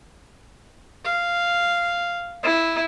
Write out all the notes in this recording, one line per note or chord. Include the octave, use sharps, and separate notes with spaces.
F5
E4